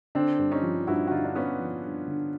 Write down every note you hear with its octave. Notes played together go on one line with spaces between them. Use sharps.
D3 C4 D4
G2
C#4 D#4
F3
G2 E4 F#4
F#4
D3 D#4 F4
D4
G2 B3 C#4
F3
G2
D3